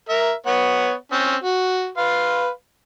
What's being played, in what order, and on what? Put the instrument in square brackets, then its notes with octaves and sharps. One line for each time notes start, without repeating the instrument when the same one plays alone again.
[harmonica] A#4 E5
B3 C#5 F#5
C4 C#4
F#4
B4 F5 C6